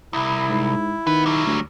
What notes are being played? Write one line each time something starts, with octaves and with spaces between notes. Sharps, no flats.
C2 E4
G#2
D#3 B3 B4
F#3 G3
D2